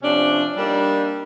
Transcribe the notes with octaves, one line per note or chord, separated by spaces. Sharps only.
C3 F3 C#4 D4
G3 A#3 D4 D#4